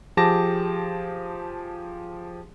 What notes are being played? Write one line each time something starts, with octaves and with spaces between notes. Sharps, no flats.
F3 G4 G#4 A5 D6 A#6